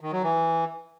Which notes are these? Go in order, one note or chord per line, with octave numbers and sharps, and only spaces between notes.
D#3
F#3
E3